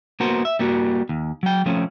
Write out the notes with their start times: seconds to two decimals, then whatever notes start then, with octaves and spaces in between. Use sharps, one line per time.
0.20 A#3 B3 F#4 A#4 C5
0.45 E5
0.59 G3 A#3 F#4
1.09 D#2
1.43 F#3 G5
1.66 F3 A3 C4 C#4